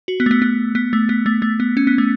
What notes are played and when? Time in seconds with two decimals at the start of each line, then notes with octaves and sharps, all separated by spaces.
0.08 F#4
0.20 B3
0.26 A3
0.31 B3
0.42 B3
0.75 B3
0.93 A3
1.09 B3
1.26 A3
1.42 A3
1.60 B3
1.77 C#4
1.87 B3
1.98 A3